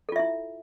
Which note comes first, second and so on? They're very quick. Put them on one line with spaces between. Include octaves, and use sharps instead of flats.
A4 F4 E5 E4